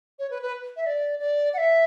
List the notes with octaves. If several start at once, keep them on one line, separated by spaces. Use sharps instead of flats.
C#5
B4
B4
E5
D5
D5
F#5
E5